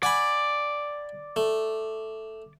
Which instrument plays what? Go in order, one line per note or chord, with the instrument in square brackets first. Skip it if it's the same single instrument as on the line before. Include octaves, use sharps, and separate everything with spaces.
[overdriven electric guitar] D5 [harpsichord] F#5 G#5 B5
[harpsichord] A3